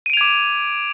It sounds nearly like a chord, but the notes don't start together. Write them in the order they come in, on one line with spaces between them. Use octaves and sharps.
D#7 D7 F7 G#6 D6